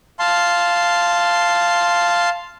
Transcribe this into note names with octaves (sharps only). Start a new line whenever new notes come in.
F5 A5 C6